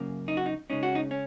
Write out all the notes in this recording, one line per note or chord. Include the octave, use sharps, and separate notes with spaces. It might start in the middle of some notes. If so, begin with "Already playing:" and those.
Already playing: F#2 C#3 A#3
D#4
F#4
D#4
C#3 G#3 C#4 D#4
F#4
D#4
C#4